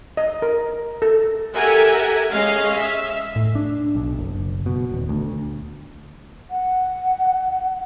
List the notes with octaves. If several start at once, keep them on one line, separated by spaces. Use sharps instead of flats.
D#5
A#4
A4
G4 A4 A#4 E5 F#5 G#5
G#3 C#4 D#5 F5
E5
A2
D4
B1
F#1
B2
D#1
D2
F#5